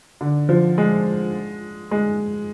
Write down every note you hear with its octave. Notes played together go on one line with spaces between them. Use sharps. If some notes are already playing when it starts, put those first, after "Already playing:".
D3
F3
G#3
G#3